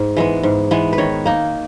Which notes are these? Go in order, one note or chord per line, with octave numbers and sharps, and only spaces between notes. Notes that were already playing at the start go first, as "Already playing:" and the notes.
Already playing: G#2
E3 G#3 B3
G#2
E3 G#3 B3
B4
D#3 C#5
A#3 D#4